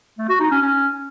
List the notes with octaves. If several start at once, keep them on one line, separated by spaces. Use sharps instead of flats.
A3
F#4
D#4
C#4
C#4